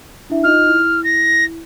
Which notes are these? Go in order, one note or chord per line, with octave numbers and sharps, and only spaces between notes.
D4 E4 E5
D#4 F4 D#5 F6
E4
A#6